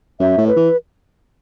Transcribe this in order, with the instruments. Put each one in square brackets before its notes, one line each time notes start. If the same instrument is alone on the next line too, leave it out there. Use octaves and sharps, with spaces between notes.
[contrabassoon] F#2 [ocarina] E5
[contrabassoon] A2
[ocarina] B4
[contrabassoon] E3